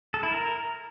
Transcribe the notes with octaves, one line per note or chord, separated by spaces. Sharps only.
A4
E4
A#4